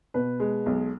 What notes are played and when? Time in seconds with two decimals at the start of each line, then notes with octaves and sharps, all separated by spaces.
0.14 B2 B4
0.40 G#3
0.66 B1